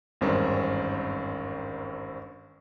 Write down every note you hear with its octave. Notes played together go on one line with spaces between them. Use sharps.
G#1 E2 G2 C4 C#4 A#4